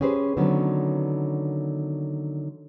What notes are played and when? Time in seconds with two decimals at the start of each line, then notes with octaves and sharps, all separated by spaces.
0.01 C#4 G4 G#4 B4 C5
0.37 D3 D#3 F#3 B3 C#4